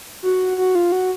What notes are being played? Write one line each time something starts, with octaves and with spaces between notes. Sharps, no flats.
F#4
F#4
F4
F#4